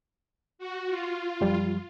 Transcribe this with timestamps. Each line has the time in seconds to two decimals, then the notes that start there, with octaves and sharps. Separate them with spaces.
0.59 F#4
0.89 F4
1.41 F#2 F3 G3